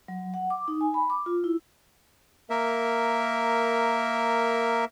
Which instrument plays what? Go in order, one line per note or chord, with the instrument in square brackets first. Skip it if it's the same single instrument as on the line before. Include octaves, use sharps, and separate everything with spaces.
[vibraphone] F#3
F#5
D6
D#4
G#5
B5
D6
F4
E4
[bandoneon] A#3 A#4 E5